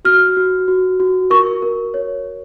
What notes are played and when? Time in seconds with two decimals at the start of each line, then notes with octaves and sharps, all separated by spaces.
0.05 F#4 F6
0.37 F#4
0.68 F#4
1.00 F#4
1.30 A#4 C#6
1.62 A#4
1.94 C#5